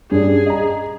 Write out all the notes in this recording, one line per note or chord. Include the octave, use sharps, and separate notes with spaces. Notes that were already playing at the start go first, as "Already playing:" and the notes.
G2 C#4 D4 G#4
D#5 A#5